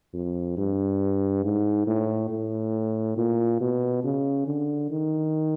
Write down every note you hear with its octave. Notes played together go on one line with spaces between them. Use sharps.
F2
G2
G#2
A2
A2
A#2
B2
C#3
D3
D#3